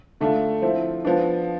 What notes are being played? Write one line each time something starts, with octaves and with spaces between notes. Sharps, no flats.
D3 A3 D4 F4
F3 C4 E4
F3 B3 D4